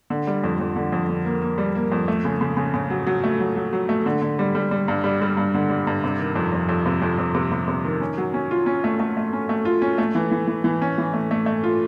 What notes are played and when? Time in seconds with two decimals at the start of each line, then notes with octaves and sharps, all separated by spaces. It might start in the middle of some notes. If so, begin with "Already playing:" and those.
0.10 D3
0.27 G3
0.44 F2
0.60 F2
0.76 D3
0.92 F2
1.09 D3
1.25 A#3
1.42 A#3
1.58 G3
1.75 A#3
1.92 F2
2.08 A3
2.25 C#3
2.41 C#3
2.57 C#3
2.74 C#3
2.90 F#3
3.07 F#3
3.24 A3
3.40 F#3
3.56 F#3
3.73 F#3
3.89 A3
4.06 D3
4.22 D3
4.39 G3
4.55 G3
4.71 G3
4.88 G2
5.04 G3
5.21 G3
5.37 G2
5.54 D3
5.70 G3
5.87 G2
6.04 C3
6.19 D#3
6.36 F2
6.53 F2
6.69 F2
6.86 C3
7.02 F2
7.18 F2
7.35 C3
7.52 C3
7.68 C3
7.85 D#3
8.01 C#4
8.18 F#3
8.34 C#4
8.51 F4
8.66 C#4
8.84 A3
9.00 A3
9.17 A3
9.33 C#4
9.49 A3
9.65 F4
9.82 C#4
9.98 A3
10.15 E3
10.31 E3
10.47 E3
10.64 E3
10.82 C#4
10.98 E3
11.14 A3
11.31 A3
11.46 A3
11.64 F4